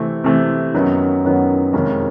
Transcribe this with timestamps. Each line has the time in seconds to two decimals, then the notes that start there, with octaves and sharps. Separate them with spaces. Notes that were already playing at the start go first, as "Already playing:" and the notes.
Already playing: C3 E3 A3 C4
0.24 C3 E3 A3 C4
0.74 F#2 D#3 F#3 B3 D#4
1.24 F#2 D#3 F#3 B3 D#4
1.73 F2 C3 D#3 G#3 C#4